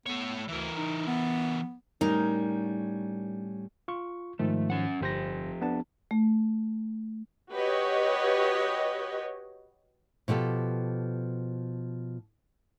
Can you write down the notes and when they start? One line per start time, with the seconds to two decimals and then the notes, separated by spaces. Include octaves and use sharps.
0.06 A3 B3 C#5
0.48 D2 E3 A#4
0.77 D#4
1.07 B3
2.01 A2 G3 C#4 D#4 A#4
3.88 F4 C#6
4.39 G#2 D#3 F3 A3
4.70 C#4 F#5
5.01 G1 F2 G4 C5 A#6
5.61 B3 D4 A5
6.11 A3
7.51 F#4 G4 B4 C#5 D#5
10.28 B2 F3 G4 A4